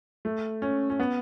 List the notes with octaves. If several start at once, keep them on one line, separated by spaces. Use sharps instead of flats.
A3
C#4
C#4
B3